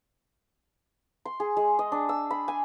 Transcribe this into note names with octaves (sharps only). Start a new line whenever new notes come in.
C6
G#4
G#3
D#5
D4
E6
B5
G#5